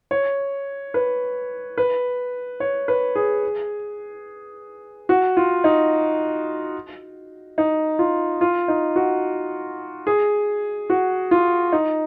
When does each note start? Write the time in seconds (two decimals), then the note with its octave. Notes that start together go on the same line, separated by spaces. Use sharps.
0.11 C#5
0.94 B4
1.78 B4
2.60 C#5
2.88 B4
3.15 G#4
5.09 F#4
5.37 F4
5.64 D#4
7.58 D#4
7.99 F4
8.41 F4
8.68 D#4
8.96 F#4
10.07 G#4
10.90 F#4
11.31 F4
11.72 D#4